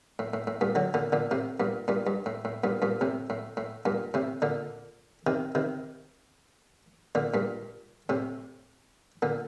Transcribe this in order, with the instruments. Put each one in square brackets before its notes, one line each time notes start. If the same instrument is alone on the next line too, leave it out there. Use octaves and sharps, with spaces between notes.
[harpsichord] A2
A2
A2
G2 A#2
D3 F#3
A#2 D3
A#2 D3
A2 C3
G2 A#2
G2 A#2
G2
A2
A2
G2 A#2
G2 A#2
A2 C3
A2
A2
G2 A#2
A2 C3
A#2 D3
C3 D#3
C3 D#3
A#2 D3
G2 A#2
A2 C3
A#2 D3